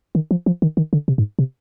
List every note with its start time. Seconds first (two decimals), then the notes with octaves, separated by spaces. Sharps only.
0.15 D#3
0.31 F3
0.46 F3
0.62 D#3
0.77 D#3
0.93 D3
1.08 C3
1.18 G#2
1.39 C3